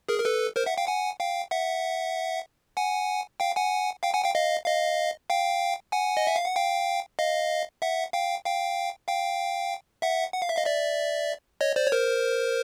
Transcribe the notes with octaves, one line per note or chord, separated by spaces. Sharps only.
G#4 A#4
A#4
A4 B4
A#4 C5
E5 F#5
F5 G5
F#5 G#5
F5 G5
E5 F#5
F#5 G#5
F5 G5
F#5 G#5
F5 G5
F#5 G#5
F5 G5
D#5 F5
D#5 F5
F5 G5
F#5 G#5
D#5
E5
F5
F#5
F5 G5
D#5 F5
E5 F#5
F5 G5
F5 G5
F5 G5
E5 F#5
F#5
F5
E5
D#5 F5
D5 E5
C#5 D#5
C5 D5
C#5
A#4 C5